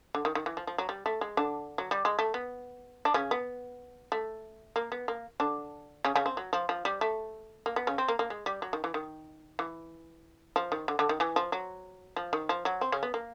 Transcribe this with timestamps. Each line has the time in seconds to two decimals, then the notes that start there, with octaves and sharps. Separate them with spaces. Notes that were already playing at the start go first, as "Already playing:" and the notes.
0.15 D3
0.25 D#3
0.35 D#3
0.46 E3
0.57 F3
0.67 F3
0.78 F#3
0.89 G3
1.06 A3
1.21 G#3
1.37 D3 D4
1.78 F#3
1.91 G3
2.05 G#3
2.19 A3
2.34 B3
3.05 D4
3.14 C#3 C#4
3.31 B3
4.12 A3
4.76 A#3
4.92 B3
5.08 A#3
5.40 D3 D4
6.05 C#3 C#4
6.16 C#3 C#4
6.26 C4
6.37 F#3
6.53 F3
6.69 F3
6.85 G3
7.01 A3
7.66 A#3
7.76 B3
7.87 C#3 C#4
7.98 C4
8.08 A#3
8.19 A#3
8.30 G#3
8.46 G3
8.62 F#3
8.73 D#3
8.84 E3
8.94 D#3
9.59 E3
10.56 F3
10.72 D#3
10.88 D3
10.99 D3
11.09 D#3
11.20 E3
11.36 F3
11.52 F#3
12.16 F3
12.33 D#3
12.49 F3
12.65 F#3
12.81 C4
12.92 C#3 C#4
13.03 B3
13.14 A#3